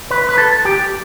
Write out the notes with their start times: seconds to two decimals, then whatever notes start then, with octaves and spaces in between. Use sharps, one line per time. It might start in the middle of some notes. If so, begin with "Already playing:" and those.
0.11 B4
0.29 B4
0.38 A4
0.65 G4